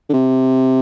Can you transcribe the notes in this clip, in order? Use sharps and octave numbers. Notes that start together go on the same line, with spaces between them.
D3
C3